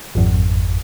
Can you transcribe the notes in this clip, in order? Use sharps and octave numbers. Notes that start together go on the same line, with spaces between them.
G#1 F2